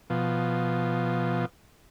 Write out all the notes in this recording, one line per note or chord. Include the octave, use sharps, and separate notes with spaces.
B2 F3